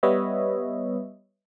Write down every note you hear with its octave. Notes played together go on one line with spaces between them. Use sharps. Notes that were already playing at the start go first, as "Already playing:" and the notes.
G3 B3 B4 C#5 D#5 E5